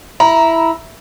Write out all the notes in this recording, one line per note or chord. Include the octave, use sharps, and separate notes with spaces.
E4 A#5